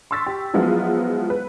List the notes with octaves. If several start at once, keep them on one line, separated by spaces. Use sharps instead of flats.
C6 C#6 E6 A6 B6
G4
F3 F#3 G#3 B3 E4 F4
B4